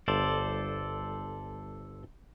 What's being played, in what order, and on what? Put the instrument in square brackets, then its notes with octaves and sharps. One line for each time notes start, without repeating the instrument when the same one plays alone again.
[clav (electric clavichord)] G1 [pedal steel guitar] A4 C5 D5